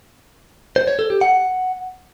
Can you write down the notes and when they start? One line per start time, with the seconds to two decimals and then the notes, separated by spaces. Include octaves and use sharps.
0.76 C5
0.87 C#5
0.99 A4
1.10 G4
1.21 F#5